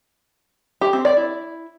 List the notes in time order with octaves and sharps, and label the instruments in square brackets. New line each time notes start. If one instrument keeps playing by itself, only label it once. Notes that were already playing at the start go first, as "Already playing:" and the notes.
[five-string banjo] G4
C4
D5
E4